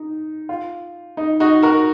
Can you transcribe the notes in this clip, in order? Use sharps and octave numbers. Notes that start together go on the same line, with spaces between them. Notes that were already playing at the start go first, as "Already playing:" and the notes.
Already playing: D#4
F4
D#4
D#4 F#4
F#4 A#4